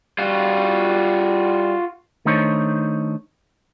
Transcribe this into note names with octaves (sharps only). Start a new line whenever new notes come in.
G3 F4 F#4
D#3 A3 D4 D#4 C5 C#5